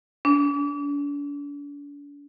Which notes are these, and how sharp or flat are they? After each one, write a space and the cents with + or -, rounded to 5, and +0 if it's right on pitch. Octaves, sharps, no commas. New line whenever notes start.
D4 -40